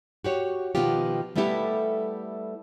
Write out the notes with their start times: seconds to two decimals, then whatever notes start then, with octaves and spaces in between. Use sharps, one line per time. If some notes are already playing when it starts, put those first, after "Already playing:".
0.24 F#4 G4 C#5
0.75 B2 D#3 F3 B3 F4 G4
1.36 G3 A3 B3 E4 G4 A4